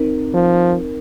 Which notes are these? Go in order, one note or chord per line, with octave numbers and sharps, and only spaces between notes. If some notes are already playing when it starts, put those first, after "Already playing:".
Already playing: C4 D#4 A#4
F3